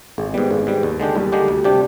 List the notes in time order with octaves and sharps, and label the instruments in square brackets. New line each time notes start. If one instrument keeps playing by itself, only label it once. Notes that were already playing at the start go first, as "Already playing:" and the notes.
[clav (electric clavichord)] G#1 [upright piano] G#3
[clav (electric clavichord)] G#2 G3 [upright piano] B3
[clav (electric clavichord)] G#1 [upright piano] G#3
[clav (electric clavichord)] G#2 G3
D#2
D3 G#3 D4 G4
[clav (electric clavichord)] D#2 [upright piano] G3
[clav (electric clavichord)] D3 G#3 D4 G4
D2
C3 G3 D4 G4